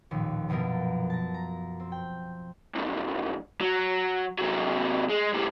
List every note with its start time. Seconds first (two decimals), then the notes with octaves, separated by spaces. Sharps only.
0.11 A1 D#2 A#2 F3
0.49 A#1 F#2 B2 F3 A#4
1.10 A5 A#6
1.34 A#5
1.80 C4
1.92 G5
2.75 C2 F#2
3.61 F#3
4.39 C3 F#3
5.09 G#3
5.34 A2 G3